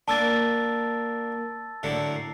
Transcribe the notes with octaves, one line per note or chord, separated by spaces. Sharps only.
A#3 D4 A5 E6 A6
A2 D3 F#3
C7